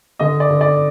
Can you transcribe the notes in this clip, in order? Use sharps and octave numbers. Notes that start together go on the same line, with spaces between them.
D3 D#5
D5
D3
D5